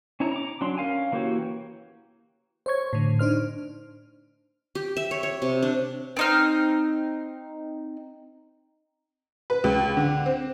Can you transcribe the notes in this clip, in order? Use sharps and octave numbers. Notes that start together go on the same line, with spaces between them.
C#4 D4 E4 C#5 A#5
A#5 D6
F#3 C#4 D4 C6
C#4 A#4 F5 G#5
E3 A#3 F#4 G4 C#5
C5 C#5 C#6 G#6
A2 D3
D4 D#4 C5 F6
G4
E5
C#5
C#5
C3
D4
C4 D#4 F6
B4
C#2
D3
C4